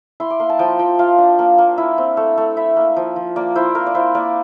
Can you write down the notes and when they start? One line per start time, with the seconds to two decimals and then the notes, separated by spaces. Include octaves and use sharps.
0.20 E4 C6
0.30 D6
0.40 A#3 C6
0.49 A5
0.59 F3 G5
0.79 F3 G5
0.99 F4 F5
1.18 D4
1.39 A#3
1.58 A#3
1.78 E4
1.98 C4
2.17 A3
2.38 A3
2.57 E4 E5
2.76 A#3
2.97 F3
3.16 F3
3.36 A#3 D5
3.55 E4 C5
3.75 A#3 A#4
3.86 D5
3.94 E4 C5
4.15 A#3 D5